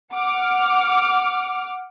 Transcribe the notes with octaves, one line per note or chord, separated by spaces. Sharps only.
F#5 D6 F6